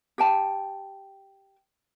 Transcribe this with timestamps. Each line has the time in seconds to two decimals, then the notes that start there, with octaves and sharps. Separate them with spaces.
0.18 G4 G5 A5